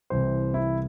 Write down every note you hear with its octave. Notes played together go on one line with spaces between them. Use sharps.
C2 C3 E3 C5
E4